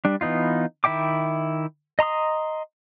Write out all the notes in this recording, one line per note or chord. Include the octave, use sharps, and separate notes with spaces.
G3 D4
E3 B3 D#4 F4
D#3 E4 E5 G5 D6
D#5 A#5 C6 D#6